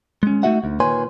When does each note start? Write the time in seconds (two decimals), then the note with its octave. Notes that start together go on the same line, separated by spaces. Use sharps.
0.23 G#3 C#4
0.43 A3 C4 D#4 F#4 E5 F#5
0.64 D2
0.80 A#2 D#3 B4 C#5 G#5 C6